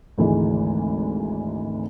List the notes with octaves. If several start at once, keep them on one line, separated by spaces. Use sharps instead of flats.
G#1 D2 E3 G#3